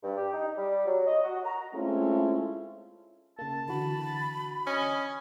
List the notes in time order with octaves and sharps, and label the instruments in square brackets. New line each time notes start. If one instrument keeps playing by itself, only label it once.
[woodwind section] G2
G4
D#4
G3
F#3
D#5
F#4
A#5
[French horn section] G#3 A3 C4 C#4 E4 F4
[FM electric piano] C#3 A#3 [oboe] A5
[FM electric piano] D3 E3 F#4 [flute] B5
[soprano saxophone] C#4 [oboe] D#5